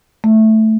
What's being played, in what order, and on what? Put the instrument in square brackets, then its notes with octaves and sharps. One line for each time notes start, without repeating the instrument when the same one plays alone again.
[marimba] A3